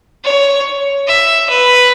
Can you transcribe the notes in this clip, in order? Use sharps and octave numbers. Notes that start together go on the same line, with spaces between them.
C#5
E5
B4